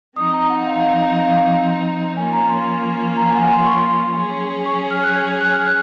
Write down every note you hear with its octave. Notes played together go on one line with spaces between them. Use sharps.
F3 C4 D#4 D#6
A#5
F#5
F5
F5
F3 A#3 C#4 F4 G#5
A#5
C6
A#5
G#5
F#5
G#5
C6
C#6
C6
F#3 C#4 G#4
C#6
F6
F#6
G#6
G#6
F#6
F6
F#6